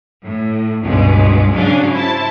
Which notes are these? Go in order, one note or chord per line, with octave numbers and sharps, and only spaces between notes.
A2
C#2 G2 B2 G#3
G#2 C#3 F#3 C#4 D4 F5
E4 C5 A5